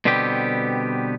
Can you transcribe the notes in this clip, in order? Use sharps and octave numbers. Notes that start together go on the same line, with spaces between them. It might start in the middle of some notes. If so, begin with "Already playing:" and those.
B2 D3 G3 B3 C4 G4